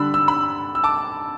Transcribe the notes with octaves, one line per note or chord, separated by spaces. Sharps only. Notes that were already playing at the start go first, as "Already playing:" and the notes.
Already playing: D3 G3 D4 B5 E6
E6
B5 E6
E6
A5 D6